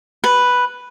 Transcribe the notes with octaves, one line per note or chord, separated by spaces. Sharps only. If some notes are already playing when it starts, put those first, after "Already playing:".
B4